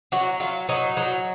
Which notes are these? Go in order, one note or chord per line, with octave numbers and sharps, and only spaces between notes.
F#3 F#4
F#3 F4
F#3 D#4
F#3